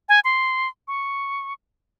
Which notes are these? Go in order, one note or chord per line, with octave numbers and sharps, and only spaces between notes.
G#5
C6
C#6